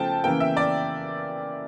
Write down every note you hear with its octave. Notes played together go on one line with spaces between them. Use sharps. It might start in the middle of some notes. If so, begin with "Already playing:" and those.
Already playing: C#3 F3 A3 G5 A5
C#3 E3 A#3 G5
E5
D5